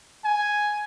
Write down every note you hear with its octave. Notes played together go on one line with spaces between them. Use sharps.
G#5